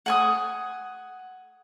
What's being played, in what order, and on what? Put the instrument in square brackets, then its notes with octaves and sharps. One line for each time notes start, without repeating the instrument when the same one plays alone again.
[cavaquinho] F#5 G#5 D#6